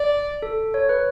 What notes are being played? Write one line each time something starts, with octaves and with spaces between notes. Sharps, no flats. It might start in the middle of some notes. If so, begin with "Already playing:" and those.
Already playing: D5
A4
C#5
B4